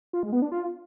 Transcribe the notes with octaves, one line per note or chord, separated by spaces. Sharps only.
F4
G#3
B3
D4
F4